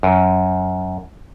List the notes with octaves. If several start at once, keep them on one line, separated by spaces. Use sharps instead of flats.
F#2